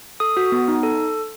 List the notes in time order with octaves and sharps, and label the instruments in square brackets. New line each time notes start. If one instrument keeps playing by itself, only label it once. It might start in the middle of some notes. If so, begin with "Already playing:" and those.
[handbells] A4 D#6
F#4
B3
D#4
A4